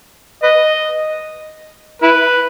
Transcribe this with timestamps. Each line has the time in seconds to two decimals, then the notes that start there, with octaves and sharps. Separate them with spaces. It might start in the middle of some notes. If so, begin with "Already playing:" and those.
0.43 B4 D#5
2.02 E4 B4